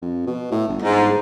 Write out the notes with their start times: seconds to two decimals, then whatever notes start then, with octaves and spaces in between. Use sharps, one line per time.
0.02 F2
0.27 B2
0.52 A2
0.68 G1
0.83 G#2